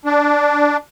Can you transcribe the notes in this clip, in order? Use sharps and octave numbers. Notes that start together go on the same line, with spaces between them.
D4